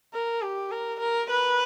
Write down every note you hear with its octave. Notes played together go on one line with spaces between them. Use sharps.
A#4
G4
A#4
A#4
B4